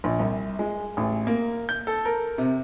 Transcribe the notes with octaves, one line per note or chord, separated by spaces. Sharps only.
A#1
C2
G#3
A1
A#3
G6
A4
A#4
C3